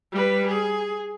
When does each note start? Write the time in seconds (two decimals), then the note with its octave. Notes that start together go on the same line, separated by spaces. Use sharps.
0.12 G3 B4
0.48 G#4